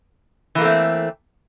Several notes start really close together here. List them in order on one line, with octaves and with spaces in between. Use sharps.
E3 A#3 A3 C4